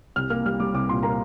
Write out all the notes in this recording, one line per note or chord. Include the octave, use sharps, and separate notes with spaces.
C2 F6
A#3 F6
G3 F6
G3 D6
C2 D6
A#2 C6
A#3 A#5